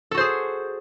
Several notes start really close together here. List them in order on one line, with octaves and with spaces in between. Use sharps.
A4 F#4 C5 G#4